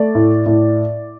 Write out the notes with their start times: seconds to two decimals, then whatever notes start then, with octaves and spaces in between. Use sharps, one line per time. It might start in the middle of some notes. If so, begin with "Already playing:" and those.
Already playing: A3 D5
0.15 A2
0.46 A2